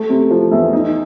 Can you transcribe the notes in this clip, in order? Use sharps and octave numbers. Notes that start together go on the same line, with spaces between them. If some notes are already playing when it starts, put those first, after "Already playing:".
Already playing: A3
C3
F3
E2
D#4